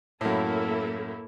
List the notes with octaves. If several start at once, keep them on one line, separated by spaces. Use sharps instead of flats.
F#2 A2 A#3 E4 A4